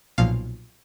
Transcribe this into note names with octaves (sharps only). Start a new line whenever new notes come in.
B1 A#2 F3 F5